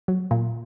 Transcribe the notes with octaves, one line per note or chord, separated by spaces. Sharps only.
F#3
A#2